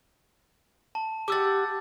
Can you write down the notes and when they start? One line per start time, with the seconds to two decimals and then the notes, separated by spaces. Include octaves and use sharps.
0.95 A5
1.28 G4 F#5 D6 E6 A6